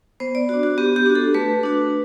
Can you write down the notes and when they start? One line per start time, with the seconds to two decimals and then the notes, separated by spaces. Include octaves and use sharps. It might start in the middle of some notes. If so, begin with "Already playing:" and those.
0.20 B3 C5
0.35 D5
0.49 D4 F#4
0.63 F#4
0.78 B3 G4
0.96 G4
1.06 D4 F#4
1.15 A4
1.34 A3 B4
1.63 D4 F#4